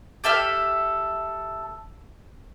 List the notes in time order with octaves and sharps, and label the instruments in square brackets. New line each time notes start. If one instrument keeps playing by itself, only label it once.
[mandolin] G4 A4 E5 F6